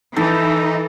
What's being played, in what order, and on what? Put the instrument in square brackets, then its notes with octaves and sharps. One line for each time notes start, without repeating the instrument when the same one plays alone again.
[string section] E3 [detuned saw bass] D#4 [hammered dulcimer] A4